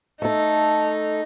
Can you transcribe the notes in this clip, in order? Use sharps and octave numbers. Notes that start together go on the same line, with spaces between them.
A3 D#4 A4